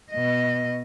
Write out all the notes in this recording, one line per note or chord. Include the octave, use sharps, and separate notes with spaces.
B2 D#5